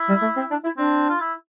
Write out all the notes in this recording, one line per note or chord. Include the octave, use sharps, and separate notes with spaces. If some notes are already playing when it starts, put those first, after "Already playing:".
Already playing: E4
G3
A3
C4
D4
E4
C4 D4
F4
E4